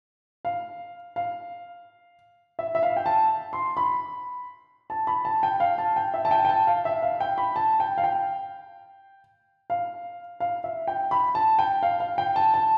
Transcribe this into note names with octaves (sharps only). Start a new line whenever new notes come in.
F5
F5
E5
E5
F5
G5
A5
C6
B5
A5
B5
A5
G5
F5
A5
G5
E5
A5
G5
G5
A5
F5
E5
F5
G5
B5
A5
G5
F5
G5
F5
F5
E5
G5
B5
A5
G5
F5
F5
G5
A5
A5